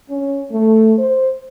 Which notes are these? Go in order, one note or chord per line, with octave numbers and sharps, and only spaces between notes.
C#4
A3
C5